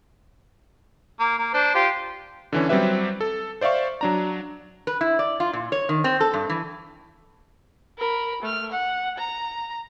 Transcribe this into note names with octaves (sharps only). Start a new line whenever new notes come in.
A#3
A#3
D4 C5
F4 G4 C6
D3 E3 C#4
F#3 G3 C4 G4 B4 E5
A4
C5 D5 E5 F5 C#6
F#3 D4 A#5
B4
E4
D5
F4
A#2
C#5
D#3
C4
A4
G2
E3
A#4 B5
A3 F6
F#5
A#5